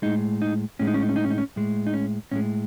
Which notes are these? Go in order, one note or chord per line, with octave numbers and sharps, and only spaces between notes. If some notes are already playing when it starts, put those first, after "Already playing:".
A2 G#3 D#4
D#4
A2 G#3 C#4
D#4
C#4
D#4
C#4
D#4
C#4
D#4
C#4
A2 G#3
D#4
C#4
A2 G#3 C#4